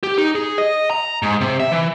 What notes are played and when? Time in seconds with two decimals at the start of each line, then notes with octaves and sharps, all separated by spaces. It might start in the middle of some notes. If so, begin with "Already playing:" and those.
0.03 G4
0.18 D#4
0.35 G#4
0.58 D#5
0.91 A#5
1.22 G#2
1.41 C3
1.60 E5
1.71 E3